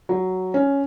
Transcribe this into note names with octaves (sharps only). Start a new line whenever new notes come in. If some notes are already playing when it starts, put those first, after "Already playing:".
F#3
C#4